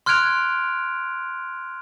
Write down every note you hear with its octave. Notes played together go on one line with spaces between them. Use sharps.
C6 F6 F#6 G#6 D7 F7